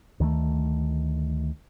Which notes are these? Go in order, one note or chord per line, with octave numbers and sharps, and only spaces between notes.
D2 D#3 E3 A3